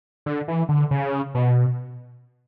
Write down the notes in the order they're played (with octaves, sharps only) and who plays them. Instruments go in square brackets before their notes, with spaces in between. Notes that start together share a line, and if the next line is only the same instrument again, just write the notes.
[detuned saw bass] D3
E3
D3
C#3
B2